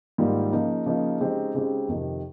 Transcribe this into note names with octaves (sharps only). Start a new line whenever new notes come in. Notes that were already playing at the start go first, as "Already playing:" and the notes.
G#2 D#3 G3 A#3 F4
C#3 F3 A#3 D#4
C#3 F3 A#3 D#4
C#3 G#3 C4 D#4 G4
C#3 G#3 C4 D#4 G4
F2 C3 D#3